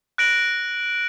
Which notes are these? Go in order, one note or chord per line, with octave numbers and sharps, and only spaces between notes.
F#6 A#6 D7 F#7